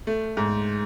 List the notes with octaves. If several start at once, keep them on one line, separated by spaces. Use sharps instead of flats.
A3
G#2